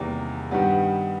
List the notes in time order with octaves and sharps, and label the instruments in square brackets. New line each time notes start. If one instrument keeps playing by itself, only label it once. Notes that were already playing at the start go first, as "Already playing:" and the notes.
Already playing: [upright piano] E2 C3 D#3 G3 A#3
G2 D#3 G3 B3